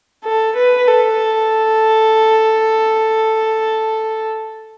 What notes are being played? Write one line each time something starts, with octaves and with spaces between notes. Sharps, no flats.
A4
B4
A4